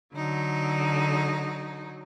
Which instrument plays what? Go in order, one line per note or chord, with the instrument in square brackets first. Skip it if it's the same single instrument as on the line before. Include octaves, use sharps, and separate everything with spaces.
[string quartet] D3 F#3 D#4